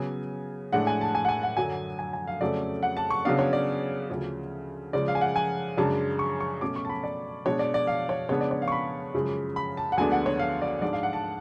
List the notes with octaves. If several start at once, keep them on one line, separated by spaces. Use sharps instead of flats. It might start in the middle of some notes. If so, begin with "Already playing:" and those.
Already playing: C#3 F#3 B3 G#5
A2 G#3 D4 F#5
G#5
A5
G#5
F#5
G#5
F#5
F#2 D3 F#3 G#5
G#5
G#5
F5
F2 C#3 F#3 A3 C#4 D5
F#5
A5
C#6
C#3 F#3 B3 D4 F5
C#5
D5
D2 C#3 F3
C#3 F3 G#3 D5
F5
G#5
F#5
G#5
F#2 C#3 G#3 D4 A5
C#6
C#6
B2 A3 C#4 D6
C#6
A5
B5
D5
B2 G#3 D4 C#5
D5
D5
F5
C#5
C#3 G#3 B3 D4 C#5
D5
C#5
F5
C#6
B5
F#2 C#3 F3 G#3
B5
A5
F#5
D2 D3 G#3 B3 D4 G#5
F#5
C#5
F5
D5
G#2 G#3 D4 D5
F5
F#5
A5